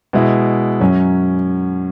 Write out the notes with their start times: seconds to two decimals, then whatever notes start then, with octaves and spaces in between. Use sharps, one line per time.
0.13 B2 G#3 E4
0.80 F#2 F#3 C#4